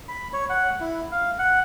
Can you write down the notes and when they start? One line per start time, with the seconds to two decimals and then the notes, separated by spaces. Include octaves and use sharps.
0.08 B5
0.33 C#5
0.49 F#5
0.80 E4
1.12 F5
1.39 F#5